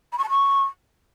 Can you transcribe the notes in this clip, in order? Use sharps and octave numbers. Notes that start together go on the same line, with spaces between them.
B5
C#6
A5
C#6